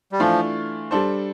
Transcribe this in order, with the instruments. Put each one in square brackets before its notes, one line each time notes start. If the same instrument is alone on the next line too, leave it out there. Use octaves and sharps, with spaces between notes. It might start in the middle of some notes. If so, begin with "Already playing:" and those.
[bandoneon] G3
[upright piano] E3 A3 D4 F4 [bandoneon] F3
[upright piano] G3 D4 A4 C5